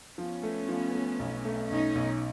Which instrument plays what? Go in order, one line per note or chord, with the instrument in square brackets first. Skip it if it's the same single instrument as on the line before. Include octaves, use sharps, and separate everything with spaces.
[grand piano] F3 [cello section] B3 C#4
[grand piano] A3
F3
A3
B1
A3
[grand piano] B1 [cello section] C#4 D#4
[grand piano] B1